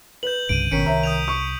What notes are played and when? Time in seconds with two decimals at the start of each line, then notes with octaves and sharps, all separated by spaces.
0.23 B4 G6 F#7
0.49 C2 G2 C#3 D7 D#7
0.71 G#1 B2 D#3 C#4 B6 C#7 D7
0.86 C2 C#5 E5 A#5
1.03 D#6 G6 F7
1.28 C#6